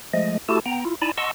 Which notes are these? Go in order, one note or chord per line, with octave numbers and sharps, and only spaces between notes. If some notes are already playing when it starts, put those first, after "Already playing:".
F3 G#3 A3 D#5
A3 E4 F#4 G4 A4 A5
B3 G5 A#5
E4 F4
D#4 E4 D5 G#5 A5 B5
D#5 F#5 A5 C6 C#6 E6